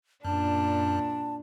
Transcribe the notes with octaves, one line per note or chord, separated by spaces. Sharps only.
F#2 A#2 D4 A5